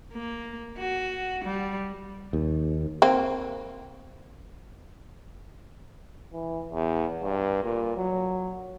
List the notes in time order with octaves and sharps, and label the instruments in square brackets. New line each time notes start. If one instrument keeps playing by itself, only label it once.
[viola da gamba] A#3
F#4
G3
[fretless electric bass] D#2
[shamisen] A#3 C4
[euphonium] E3
E2
G2
A#2
F#3